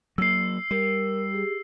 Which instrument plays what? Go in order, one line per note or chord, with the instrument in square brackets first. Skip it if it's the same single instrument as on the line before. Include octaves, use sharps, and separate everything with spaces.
[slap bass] F#3 A#3 [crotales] E6 C7
[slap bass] G3 [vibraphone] A#4
[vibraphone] G4 G#4